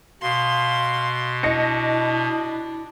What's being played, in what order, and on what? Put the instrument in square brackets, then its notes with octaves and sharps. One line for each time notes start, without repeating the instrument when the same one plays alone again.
[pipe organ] B2 [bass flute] F5 [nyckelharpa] C6
[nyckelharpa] D4 [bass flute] E4 [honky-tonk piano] D#5 A#6 C#7